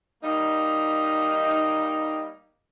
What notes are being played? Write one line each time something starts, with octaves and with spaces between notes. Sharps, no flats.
G3 A#3 D#4